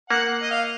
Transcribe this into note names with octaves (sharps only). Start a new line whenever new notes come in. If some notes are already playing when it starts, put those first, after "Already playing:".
A#3 F#5
D#5
F5